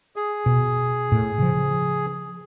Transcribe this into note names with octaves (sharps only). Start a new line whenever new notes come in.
G#4
B2
A2
C#3 F3